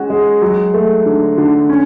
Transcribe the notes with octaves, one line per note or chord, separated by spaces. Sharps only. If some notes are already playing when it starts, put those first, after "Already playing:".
Already playing: G#3 C#4 F#4
G#3
F#3
A3
D3
D3
C#4